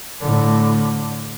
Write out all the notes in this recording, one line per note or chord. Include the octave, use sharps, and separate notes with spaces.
A2 D3